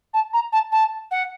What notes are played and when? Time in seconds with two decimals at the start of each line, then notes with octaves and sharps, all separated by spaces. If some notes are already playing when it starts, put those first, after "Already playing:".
0.13 A5
0.33 A#5
0.52 A5
0.72 A5
1.11 F#5